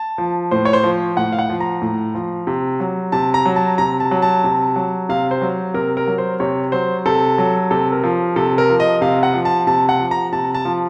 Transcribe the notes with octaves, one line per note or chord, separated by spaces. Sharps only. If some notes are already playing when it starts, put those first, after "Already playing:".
Already playing: A5
F3
A2 C5
C#5
C5
F3
A2 F#5
F5
F#5
F3
A#5
A2
F3
C3
F#3
C3 A5
A#5
F#3
A5
C3 A#5
A5
F#3
A5
C3
F#3
C3 F5
C5
F#3
C3 A#4
A#4
F#3
C5
C3 C#5
F#3 C5
C3 A4
F#3
C3 A4
A#4
F3
C3 A4
A#4
F3
D#5
C3 F5
F#5
F3
A5
C3 A5
F#5
F3
A#5
C3 A5
A5
F3